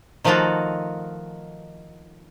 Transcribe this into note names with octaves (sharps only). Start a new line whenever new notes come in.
D#3 F3 A3 D#4 F4 F#4